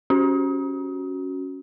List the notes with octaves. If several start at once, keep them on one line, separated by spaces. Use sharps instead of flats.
C#4 F#4